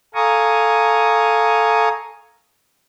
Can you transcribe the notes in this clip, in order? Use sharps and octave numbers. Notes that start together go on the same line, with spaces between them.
A4 F5 G#5 A#5 C#6 D#6